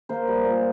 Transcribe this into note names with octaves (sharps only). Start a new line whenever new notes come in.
A#3 C5
G3
A#2